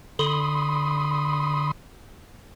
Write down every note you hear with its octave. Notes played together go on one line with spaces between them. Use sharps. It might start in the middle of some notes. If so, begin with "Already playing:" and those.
D3 B5 C6 D#6